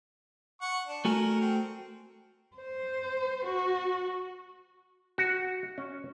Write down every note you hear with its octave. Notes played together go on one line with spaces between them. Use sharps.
F#5 C#6
D4
A3 F#4 A#4 G#5
C4
C5
F#4
F#4
C#4